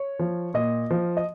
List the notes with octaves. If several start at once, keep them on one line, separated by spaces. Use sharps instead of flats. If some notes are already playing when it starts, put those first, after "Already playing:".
Already playing: C#5
F3
A#2 D#5
F3
D#5